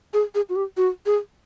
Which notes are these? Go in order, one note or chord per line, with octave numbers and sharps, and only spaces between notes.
G#4
G#4
F#4
G4
F#4
G#4